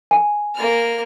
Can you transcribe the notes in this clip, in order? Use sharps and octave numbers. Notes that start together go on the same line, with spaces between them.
G#5
A#3 F6